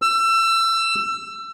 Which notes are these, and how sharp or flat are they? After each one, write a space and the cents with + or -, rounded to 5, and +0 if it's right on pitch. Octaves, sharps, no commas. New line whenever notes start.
E6 +25